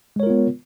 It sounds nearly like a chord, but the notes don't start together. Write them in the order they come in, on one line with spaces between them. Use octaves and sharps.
G#3 C#5 A#4 F4 B3